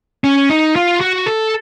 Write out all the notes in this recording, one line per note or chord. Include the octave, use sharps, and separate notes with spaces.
C#4
D#4
F4
F#4
A4